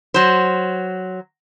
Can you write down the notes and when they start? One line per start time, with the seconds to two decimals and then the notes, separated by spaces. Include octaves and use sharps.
0.14 F#3 C5